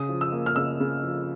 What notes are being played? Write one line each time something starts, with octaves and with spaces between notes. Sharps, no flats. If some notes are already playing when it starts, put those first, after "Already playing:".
Already playing: C#3 D#6
F3
E6
A#3
F6
C#3 E6
C#3
F3